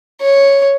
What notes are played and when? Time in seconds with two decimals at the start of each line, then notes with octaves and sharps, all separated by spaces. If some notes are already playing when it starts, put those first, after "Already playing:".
0.21 C#5